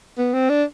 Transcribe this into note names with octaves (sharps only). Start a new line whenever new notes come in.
B3
C4
D4